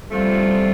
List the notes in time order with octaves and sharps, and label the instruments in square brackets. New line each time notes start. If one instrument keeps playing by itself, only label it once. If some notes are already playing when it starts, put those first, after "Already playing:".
[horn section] F3 A3 C4 F4 [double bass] G3